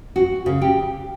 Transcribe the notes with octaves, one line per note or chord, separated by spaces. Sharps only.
F#4
C#3
G4